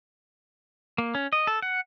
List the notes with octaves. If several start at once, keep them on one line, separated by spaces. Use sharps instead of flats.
A#3
C#4
D#5
A4
F#5